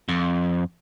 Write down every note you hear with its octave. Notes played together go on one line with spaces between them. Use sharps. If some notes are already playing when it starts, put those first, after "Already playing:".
F2